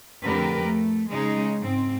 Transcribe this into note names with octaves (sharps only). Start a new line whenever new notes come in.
F2 A2 D3 G4 A#4 B4
A3
C#3 G#3 C#4 D#4 G#4
G#2 C4